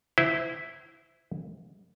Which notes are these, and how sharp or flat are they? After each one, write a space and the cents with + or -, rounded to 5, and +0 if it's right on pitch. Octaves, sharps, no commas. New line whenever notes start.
E4 +0 C5 -30